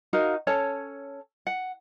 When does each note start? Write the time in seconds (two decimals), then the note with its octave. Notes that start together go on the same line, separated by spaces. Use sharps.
0.13 D#4 F#4 A#4 F5
0.47 C#4 A4 C#5 A5
1.47 F#5